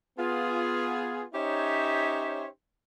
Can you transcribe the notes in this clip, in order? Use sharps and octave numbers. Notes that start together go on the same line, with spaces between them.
B3 F4 G#4
C#4 D#4 G4 C5 C#5 E5